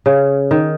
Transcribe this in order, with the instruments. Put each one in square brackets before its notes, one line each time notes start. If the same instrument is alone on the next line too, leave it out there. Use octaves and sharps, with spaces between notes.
[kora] C#3
D#3